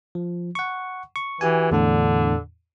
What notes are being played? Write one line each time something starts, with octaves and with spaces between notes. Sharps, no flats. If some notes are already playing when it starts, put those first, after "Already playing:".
F3
F#5 C#6
C#6
E3 F#4 G4 G#5
E2 A2 D3 D4